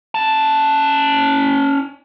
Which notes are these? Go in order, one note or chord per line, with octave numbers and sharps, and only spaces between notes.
C#4 A5